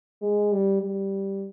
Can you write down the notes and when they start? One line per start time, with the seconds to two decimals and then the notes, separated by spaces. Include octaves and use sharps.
0.22 G#3
0.52 G3
0.82 G3